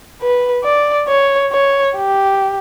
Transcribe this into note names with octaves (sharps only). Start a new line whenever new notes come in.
B4
D5
C#5
C#5
G4